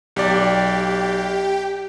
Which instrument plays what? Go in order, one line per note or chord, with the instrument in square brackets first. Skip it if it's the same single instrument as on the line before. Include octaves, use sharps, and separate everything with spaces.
[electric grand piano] B1 D5 [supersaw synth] G4 G5